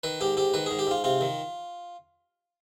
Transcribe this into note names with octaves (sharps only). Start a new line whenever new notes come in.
D#3 B4
G#2 G4
G#2 G4
D#3 B4
G#2 G#4
G4
G#2 F4
C3 F4
D#3